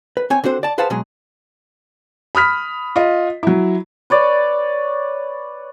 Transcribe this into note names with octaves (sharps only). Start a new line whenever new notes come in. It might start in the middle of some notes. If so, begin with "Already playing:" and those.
B4
C4 C#5 G#5
D3 C4 F#4 C5
D5 A5
G#4 B4 C5 F5 F#5 A5
B2 F#3 G#3 G#4
B5 D#6 F6 B6
F4 D#5
F#3 E4
B4 C#5 D5